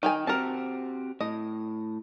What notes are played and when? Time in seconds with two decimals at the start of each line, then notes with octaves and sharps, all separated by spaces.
0.03 D#3 D#4 G5 G#5
0.27 C4 F#4 G4 A#4 A5
1.21 A2 D#5